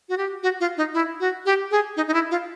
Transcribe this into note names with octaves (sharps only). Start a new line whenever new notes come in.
F#4
G4
F#4
F4
D#4
E4
F#4
G4
G#4
D#4
D#4
E4
F4